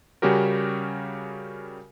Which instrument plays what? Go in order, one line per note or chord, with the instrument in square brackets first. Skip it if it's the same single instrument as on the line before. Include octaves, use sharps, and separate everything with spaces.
[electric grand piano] C#3 G3 C#4 F#4 G4 A#4